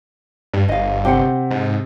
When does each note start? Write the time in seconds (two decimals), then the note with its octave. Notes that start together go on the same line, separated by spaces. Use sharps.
0.53 G2
0.68 G1 D#5 F5
1.05 C3 G4 C5 F#5
1.50 G#2